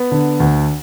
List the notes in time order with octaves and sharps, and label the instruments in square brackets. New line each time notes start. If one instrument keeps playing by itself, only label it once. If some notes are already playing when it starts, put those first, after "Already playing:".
Already playing: [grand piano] B3
D3
D2